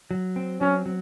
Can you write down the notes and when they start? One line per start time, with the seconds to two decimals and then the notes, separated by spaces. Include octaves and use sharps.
0.11 F#3
0.36 C4
0.61 F#3 C#4
0.86 F#3